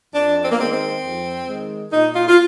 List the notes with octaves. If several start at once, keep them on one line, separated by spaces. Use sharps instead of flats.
F2 D4
C4
A#3
D#3 G#3 C4
C4
F2
D#3 G#3
A#2 D#4
F4
F4